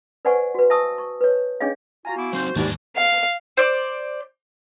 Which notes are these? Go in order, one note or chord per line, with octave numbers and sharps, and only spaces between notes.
B4 C5 D5 F#5 G#5 C#6
F#4 B4
E5 G#5 A5 C#6 D#6 E6
C#6
B4 C#5
C#4 D4 G#4 C#5 D#5 F5
F4 F#4 F5 G#5 A#5
B3 E4 F#4 D6
F#3 C4 D#4 C5
D#2 G#2 D#3 E3 G3 D4 G#5 A5
F5
C5 D5